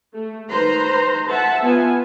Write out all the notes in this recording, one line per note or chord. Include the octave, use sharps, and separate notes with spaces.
A3
D#3 B4 C5 A#5 C6
E5 F#5 A5
B3 F4 G#5